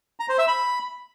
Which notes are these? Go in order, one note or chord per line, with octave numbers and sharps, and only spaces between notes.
A#5
C5
E5
B5